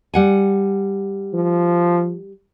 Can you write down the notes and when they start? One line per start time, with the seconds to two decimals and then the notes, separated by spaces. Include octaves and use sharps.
0.14 G3 F#5 G#5
1.34 F3